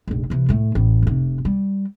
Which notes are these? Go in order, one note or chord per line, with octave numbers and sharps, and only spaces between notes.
F1 A#1
C3 E3
A2 A3
A1
F1 C3
G3